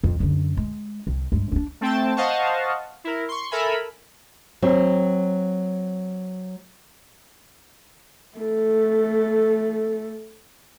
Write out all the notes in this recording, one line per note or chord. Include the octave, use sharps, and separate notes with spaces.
F2
F#2 D3
G#3
C2
G2 G#3
C#4 D4
A3 C4 G5 A5
C5 D#5 F5 F#5 A5 C#6
E4 A#4
C6 C#6
A4 A#4 E5 G#5 B5
F#3 C4
A3 A4